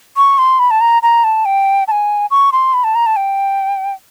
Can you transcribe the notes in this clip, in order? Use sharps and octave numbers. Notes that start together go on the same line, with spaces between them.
C#6
C6
B5
A5
A#5
A#5
A5
G5
A5
G#5
C#6
C6
B5
A5
A#5
A5
G5